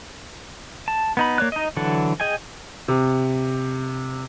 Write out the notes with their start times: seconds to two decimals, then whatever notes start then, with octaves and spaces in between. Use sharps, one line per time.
0.88 A5
1.17 B3 D#4 B5
1.38 A#3 C#5 D5 F#6
1.52 D#4 D#5
1.77 D3 E3 F#3 A4 F#5
2.20 G#4 D#5 G5 G#5
2.88 C3